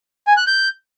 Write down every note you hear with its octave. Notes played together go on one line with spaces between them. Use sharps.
G#5
F#6
G6